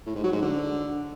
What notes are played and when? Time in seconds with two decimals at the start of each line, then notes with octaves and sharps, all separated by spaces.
0.06 A2
0.15 G#2
0.24 F#3
0.33 G#2
0.41 D3